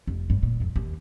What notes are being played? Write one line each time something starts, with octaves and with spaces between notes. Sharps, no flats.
F1
G2
A#2
F2
D#2